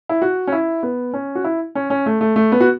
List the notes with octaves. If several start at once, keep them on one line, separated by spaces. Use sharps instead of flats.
E4
F#4
C#4
E4
B3
C#4
F#4
E4
C#4
C#4
A3
A3
A3
B3
F#4